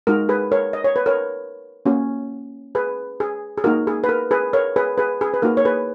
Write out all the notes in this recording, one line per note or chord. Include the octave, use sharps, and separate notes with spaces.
G#3 D#4 F#4 A#4
G#4 B4
A#4 C#5
D#5
C#5
B4
A#4 C#5
A#3 C#4 F#4
G#4 B4
G#4
G#4
A#3 D#4 F#4 A#4
G#4
B4
A#4
G#4 B4
A#4 C#5
G#4 B4
G#4 B4
G#4
B4
A#3 D#4 F#4 A#4
C#5
G#4 B4